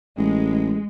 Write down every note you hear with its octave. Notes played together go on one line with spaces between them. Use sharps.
A1 G#3